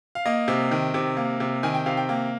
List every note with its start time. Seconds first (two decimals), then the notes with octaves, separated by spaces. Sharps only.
0.15 F5
0.26 A#3 D#5
0.48 C3
0.71 D#3
0.94 C3
1.17 A#3
1.40 C3
1.63 D#3 G#5
1.75 G5
1.86 C3 F5
1.97 G5
2.09 A#3